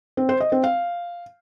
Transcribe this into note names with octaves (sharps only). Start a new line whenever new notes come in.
C4
C5
D#5
C4
F5